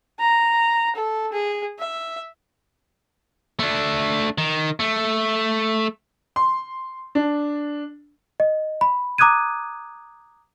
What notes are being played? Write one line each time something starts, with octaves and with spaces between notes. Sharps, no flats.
A#5
A4
G#4
E5
A3 D4
D#3
A3
C6
D4
D#5
B5
A#5 D6 D#6 F#6 G#6 D#7